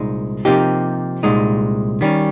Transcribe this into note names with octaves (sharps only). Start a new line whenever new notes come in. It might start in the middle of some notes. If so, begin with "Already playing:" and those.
Already playing: C2 A#2 G#3 D#4
C3 F3 A#3 D#4 G4
C2 A#2 G#3 D#4
D#3 G3 C#4